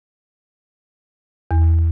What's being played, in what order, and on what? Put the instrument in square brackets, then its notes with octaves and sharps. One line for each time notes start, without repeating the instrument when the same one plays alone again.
[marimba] E2